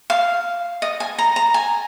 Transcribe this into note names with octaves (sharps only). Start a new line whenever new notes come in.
F5
D#5
G#5
A#5
A#5
G#5